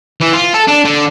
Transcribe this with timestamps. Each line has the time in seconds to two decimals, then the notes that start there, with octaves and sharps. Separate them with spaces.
0.20 E3
0.33 F4
0.54 A4
0.68 D4
0.85 D3